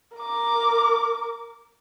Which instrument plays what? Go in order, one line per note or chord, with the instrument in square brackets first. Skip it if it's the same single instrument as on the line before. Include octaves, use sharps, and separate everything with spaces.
[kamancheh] A#4 D6